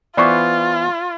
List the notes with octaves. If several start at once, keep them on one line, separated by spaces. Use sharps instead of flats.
E3 B3 F4 C5 D5 C#6 D6